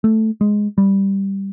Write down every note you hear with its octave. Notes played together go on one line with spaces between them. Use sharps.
A3
G#3
G3